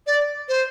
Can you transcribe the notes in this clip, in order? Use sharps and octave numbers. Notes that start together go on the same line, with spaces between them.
D5
C5